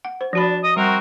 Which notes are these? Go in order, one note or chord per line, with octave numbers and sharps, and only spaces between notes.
F#5
C5
F3 D4 F#4 B5
D#5
G3 C4 F#4 A#4